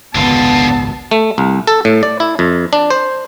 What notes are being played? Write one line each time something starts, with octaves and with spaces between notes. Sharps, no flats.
G#1 C#2 F#2 D3 B3 F4 A5
A3
C2
A4
A2
D5
E4
F2
D4
C5